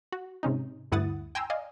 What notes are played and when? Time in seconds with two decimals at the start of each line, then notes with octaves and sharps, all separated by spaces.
0.12 F#4
0.43 G#2 C3 C#4 D#4
0.92 D2 G2 E4 F#5 D#6 A6
1.35 G5 G#5 A#5 C6 E6
1.50 D5 D#5 F5 G#5